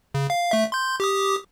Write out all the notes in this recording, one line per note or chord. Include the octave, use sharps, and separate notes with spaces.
C#3
F5
A3 E5
C6 G6
G4 D6 D#6